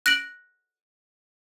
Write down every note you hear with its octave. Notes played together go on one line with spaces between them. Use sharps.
F#6 A#6 D7 F#7